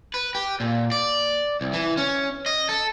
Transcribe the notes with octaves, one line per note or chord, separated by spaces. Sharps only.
B4
G4
A#2
D5
C2
E3
C#4
D#5
A4